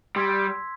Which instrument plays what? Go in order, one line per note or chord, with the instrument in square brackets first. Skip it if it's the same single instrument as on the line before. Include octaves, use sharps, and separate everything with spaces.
[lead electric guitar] G3 [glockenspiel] C6 E6 G#6 B6